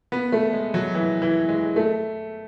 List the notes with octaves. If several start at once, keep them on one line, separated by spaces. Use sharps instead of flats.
B3
A3
G#3
F#3
E3
E3
G#3
A3